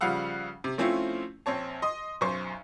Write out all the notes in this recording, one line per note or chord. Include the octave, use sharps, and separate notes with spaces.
C#3 F3 G3 F5 F#5 E6
C3
F3 A3 C4 C#4 E4 F4
A#1 C4 C#5 A5
D#5 C6 D#6
B1 F#2 C5 C#6